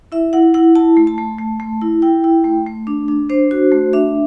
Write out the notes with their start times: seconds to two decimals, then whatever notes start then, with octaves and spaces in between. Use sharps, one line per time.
0.12 E4 E5
0.33 E4 F#5
0.54 E4 F#5
0.76 E4 A5
0.97 A3
1.07 A5
1.18 A3
1.38 A3
1.60 A3
1.81 E4
2.02 E4 G5
2.24 E4
2.44 A3
2.67 A3
2.87 D4
3.08 D4
3.30 D4 C5
3.51 F#4
3.72 A3
3.93 D4 E5